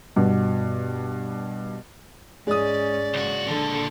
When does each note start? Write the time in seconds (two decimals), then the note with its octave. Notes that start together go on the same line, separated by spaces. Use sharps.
0.16 G2 B2
2.47 G#2 G#3 C#4 D5 D#6
3.14 C#2 F#4
3.48 A#2 D3 A4